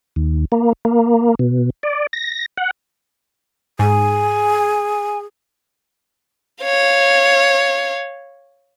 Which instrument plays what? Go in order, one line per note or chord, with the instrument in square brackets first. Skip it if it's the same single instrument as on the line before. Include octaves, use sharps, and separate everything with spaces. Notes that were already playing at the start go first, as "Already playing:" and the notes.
[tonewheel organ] D#2
A#3
A#3
B2
D5
A#6
F#5
[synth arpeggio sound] G#2 [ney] G#4 [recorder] G#5
[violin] C#5 F5